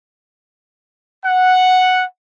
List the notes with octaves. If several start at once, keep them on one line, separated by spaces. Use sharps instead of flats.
F#5